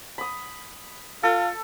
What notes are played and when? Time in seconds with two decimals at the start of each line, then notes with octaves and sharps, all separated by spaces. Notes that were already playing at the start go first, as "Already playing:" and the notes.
0.18 B5 D#6
1.23 F4 A4